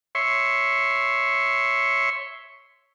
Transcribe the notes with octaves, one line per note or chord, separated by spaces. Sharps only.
C#5 E5 C6 C#6